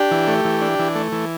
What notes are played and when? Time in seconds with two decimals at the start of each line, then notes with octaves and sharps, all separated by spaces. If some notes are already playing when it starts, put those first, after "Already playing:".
Already playing: D4 G4
0.11 E3
0.28 A3
0.45 E3
0.61 D4
0.79 E3
0.95 A3
1.12 E3